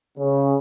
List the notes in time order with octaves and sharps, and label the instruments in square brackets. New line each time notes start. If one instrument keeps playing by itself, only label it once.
[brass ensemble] C#3